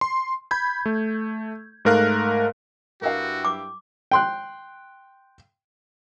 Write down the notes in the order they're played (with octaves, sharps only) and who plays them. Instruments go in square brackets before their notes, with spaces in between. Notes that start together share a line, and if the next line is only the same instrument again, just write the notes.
[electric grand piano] C6
B5 G6 G#6
A3
G#2 A3 A#4 F5 F#6
[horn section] G2 E4 G4 [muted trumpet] F#4 [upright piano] A#4 F5
[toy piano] D6
[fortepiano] G5 C6 F#6